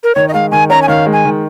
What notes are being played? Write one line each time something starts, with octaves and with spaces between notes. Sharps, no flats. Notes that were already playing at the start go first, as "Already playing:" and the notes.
A#4
D#3 C#5
D#5
G#3 F5
D#3 G#5
C#4 A#5
G#5
D#3 F5
G#3
G#5
D#3